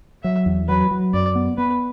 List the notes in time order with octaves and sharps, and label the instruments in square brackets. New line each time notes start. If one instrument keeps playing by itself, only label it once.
[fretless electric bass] F#3 [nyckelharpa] E5
[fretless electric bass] E2
[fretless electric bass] F#3 [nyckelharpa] B4
[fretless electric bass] F#3
[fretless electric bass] F#2 [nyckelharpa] D5
[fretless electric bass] B3
[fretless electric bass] B3 [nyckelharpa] B4